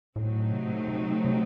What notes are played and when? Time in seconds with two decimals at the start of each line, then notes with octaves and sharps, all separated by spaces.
0.16 A2 F#3 A3 C4 D#4
0.52 C3
0.88 C3
1.25 C3